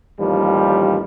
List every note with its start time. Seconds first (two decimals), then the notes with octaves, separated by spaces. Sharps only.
0.20 A1 D#2 F3 G3